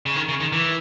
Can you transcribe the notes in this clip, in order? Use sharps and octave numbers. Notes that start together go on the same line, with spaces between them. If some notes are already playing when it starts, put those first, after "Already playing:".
C#3
D#3
C#3
D#3
E3